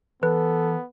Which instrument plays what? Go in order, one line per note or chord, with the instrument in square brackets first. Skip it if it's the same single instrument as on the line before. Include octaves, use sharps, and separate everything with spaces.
[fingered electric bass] E3 [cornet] B3 [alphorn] A4 [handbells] B4